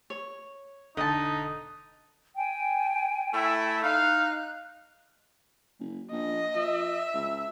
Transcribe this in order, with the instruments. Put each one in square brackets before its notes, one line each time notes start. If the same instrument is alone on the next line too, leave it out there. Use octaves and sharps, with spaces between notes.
[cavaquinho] C#5
[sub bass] E1 [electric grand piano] D3 [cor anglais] D#4 [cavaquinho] D#5 A5
[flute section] G5 G#5
[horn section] A3 E4 E5
[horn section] D#4 F5 [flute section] F#6
[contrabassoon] F#1
[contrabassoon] A#1 [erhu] D#5
[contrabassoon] F3 [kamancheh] E5
[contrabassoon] C#2